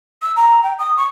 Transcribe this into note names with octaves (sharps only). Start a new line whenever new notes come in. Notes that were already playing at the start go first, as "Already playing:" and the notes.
E6
A#5
G5
D#6
C#6